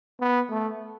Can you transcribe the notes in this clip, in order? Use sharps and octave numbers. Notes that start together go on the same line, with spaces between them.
B3
A3